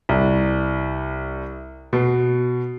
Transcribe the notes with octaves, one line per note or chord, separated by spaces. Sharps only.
C2
B2